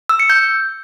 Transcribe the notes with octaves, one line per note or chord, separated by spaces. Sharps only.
E6
C#7
G6